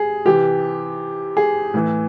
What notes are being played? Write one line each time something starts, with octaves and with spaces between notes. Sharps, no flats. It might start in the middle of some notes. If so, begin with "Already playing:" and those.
Already playing: C3 G#4
C3 E3 G4
G#4
A2 E3